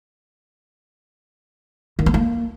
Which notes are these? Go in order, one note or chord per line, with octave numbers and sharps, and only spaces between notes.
D#3
B3
A#3